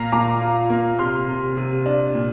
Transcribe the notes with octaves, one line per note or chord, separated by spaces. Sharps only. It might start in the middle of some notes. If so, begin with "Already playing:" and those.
Already playing: A#2 A#3 F5 A#5
A#2 A#5 D6
F4
A#3
C3 C6 F6
C3
C3
D4
A#2